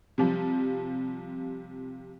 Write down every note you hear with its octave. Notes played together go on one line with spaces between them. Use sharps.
C3 F3 G3